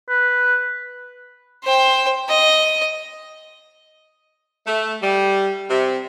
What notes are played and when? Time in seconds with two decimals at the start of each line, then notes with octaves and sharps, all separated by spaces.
0.09 B4
1.64 C5 G5
2.29 D#5
4.66 A3
5.01 G3
5.70 C3